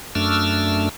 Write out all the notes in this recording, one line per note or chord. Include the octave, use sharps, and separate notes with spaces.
F#2 A3 D4 E6 F6